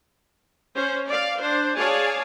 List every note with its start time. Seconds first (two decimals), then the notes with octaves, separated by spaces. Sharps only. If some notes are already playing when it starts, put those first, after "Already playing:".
0.74 C#4 C5
1.07 D5 F5
1.40 D4 C5
1.77 G#4 C#5 D5 F5 G#5 A5